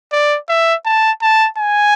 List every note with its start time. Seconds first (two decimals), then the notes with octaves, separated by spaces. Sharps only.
0.12 D5
0.49 E5
0.85 A5
1.22 A5
1.58 G#5